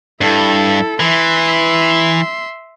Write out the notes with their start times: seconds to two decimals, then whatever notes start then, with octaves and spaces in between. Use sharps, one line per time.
0.21 G2 E4 A4
1.00 E3 E5 C6